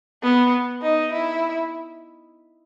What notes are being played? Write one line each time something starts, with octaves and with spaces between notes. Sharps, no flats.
B3
D#4
E4